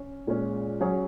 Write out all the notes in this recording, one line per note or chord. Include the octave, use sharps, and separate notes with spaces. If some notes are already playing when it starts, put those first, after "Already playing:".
Already playing: C#4
A#2 G#3 C#4
F#3 C#4 G#4 C#5